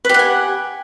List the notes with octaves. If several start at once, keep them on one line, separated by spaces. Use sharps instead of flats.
G4 B4 F#5 G#5